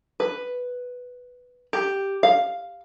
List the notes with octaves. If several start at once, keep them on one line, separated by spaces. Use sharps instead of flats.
B4
G4
F5